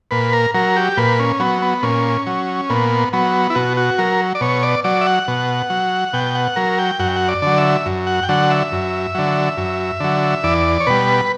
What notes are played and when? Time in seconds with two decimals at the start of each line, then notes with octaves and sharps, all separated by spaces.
0.11 A#2 B4
0.33 A#4
0.54 F#3 A#4
0.76 G4
0.97 A#2 B4
1.19 C#4
1.40 F#3 B3
1.62 B3
1.83 A#2 C#4
2.27 F#3
2.70 A#2 B3
3.13 F#3 B3
3.50 E4
3.55 B2 F#4
3.77 F#4
3.98 F#3 A#4
4.35 D5
4.41 B2 C#5
4.63 D5
4.84 F#3 D5
5.01 E5
5.07 F#5
5.28 B2
5.70 F#3
6.13 B2 G5
6.35 F#5
6.56 F#3 A#4
6.79 G5
6.99 F#2 F#5
7.08 G5
7.16 F#5
7.29 D5
7.42 D3 F#3
7.58 E5
7.86 F#2
8.07 F#5
8.23 G5
8.29 D3 F#3 F#5
8.51 E5
8.72 F#2
9.15 D3 F#3
9.57 F#2
10.00 D3 F#3
10.43 E2 D5
10.80 C#5
10.87 B2 G3 B4